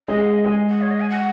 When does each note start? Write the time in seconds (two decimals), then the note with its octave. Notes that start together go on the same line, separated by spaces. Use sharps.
0.08 G#3 G#4 D#5
0.20 F#5
0.33 D#5
0.45 G#3 G#4 G#5
0.69 F#5
0.81 C#5
0.91 D#5
1.00 G#5
1.10 F#5